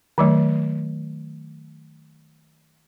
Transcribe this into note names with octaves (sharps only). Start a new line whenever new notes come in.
D#3 F#3 A3